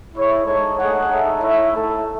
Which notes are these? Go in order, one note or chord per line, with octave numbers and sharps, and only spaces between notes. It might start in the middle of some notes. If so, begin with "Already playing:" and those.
E4 G#4 C#5 E5
G#3 D#4 A4 C#5
A3 D#4 G#4 C#5 F#5
D#4 A4 E5
E4 A4 C#5 E5
A3 E4 A4 E5